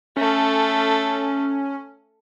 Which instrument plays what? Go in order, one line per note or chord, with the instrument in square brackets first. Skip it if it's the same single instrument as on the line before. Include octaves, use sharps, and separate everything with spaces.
[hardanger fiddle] A3 A4 [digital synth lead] C#4